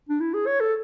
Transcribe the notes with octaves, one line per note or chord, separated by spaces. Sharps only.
D4
E4
G#4
C#5
A4